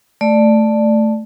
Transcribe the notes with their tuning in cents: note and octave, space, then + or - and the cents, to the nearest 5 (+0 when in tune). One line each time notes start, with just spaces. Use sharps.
A3 +0 D5 +10